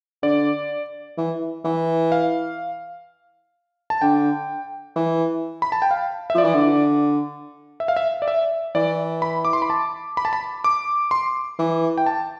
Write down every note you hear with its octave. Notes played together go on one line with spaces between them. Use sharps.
D3 D5
E3
E3
F5
A5
D3 G5
E3
B5
A5
G5
F5
E5
F3 D5
E3
D3
E5
F5
E5
D5
E5
E3 D5
B5
D6
C6
B5
A5
B5
A5
B5
D6
C6
E3
G5
A5